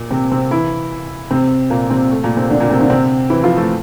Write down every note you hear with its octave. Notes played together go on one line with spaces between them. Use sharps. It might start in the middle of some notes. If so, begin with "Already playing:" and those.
Already playing: A#2
C3 C4
C3 C4
E3 E4
C3 C4
A#2 A#3
C3 C4
A3
A#2 A#3
C3 C4
D3 D4
A#2 A#3
C3 C4
D3 D4
C3 C4
E3 E4
F3 F4
A3 A4